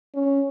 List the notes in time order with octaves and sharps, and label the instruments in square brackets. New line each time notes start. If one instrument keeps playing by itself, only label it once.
[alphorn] C#4